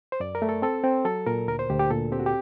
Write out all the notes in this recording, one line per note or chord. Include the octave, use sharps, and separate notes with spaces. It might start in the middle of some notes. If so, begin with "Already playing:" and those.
C5
F#2 D5
A#4
A3
A4
C4 A4
C4
F#3 A4
A#2 A#4
D2 A#4
C5
D2 G4
G4
A#2 A4
C4 G4
F#4
G4